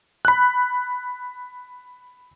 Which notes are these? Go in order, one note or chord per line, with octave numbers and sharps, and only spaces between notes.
B5 F#6